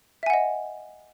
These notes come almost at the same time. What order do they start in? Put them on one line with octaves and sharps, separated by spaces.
E5 G#5 F#5 D#5